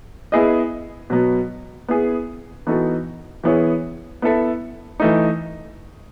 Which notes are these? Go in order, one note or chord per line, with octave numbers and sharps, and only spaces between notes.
B3 E4 G#4 D#5
B2 F#3 B3
B3 E4 G#4
E3 B3 D#4 F#4 A4
E3 B3 E4 G#4 C#5
B3 E4 A4 E5
E3 A3 D#4